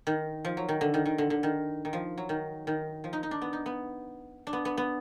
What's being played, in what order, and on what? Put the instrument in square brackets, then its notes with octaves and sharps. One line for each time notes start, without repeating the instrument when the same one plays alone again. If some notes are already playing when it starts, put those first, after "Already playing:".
[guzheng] D#3
F3
F#3
D#3
D3
D#3
D#3
D3
D3
D#3
D#3
F3
F#3
D#3
D#3
F3
D#4
D#4
D4
B3
D#4
B3
D4
B3
B3
B3